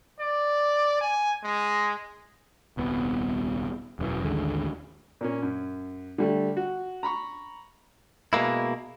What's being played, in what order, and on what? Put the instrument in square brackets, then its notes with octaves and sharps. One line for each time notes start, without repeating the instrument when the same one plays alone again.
[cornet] D5
G#5
G#3
[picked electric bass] D#1 C2 B3
E1 F#2 A2 E3
A1 D#2 D3 G#3
[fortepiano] A#2 A#3 C#4
F#2
D3 G3 A3
F#4
A#5 B5 C#6
[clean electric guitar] B2 G#3 A#3 E4